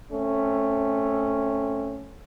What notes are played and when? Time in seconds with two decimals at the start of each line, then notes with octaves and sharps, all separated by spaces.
0.11 A3 C4 C#4